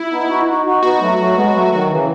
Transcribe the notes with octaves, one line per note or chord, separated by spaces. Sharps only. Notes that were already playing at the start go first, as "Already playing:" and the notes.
Already playing: E4
B3 D#4
D#4 F#4
D#4 F#4
D#4 F#4
B3 D#4 F#4
F#3 A3
F#3 A3
G#3 B3
F#3 A3
D#3 F#3
C#3 E3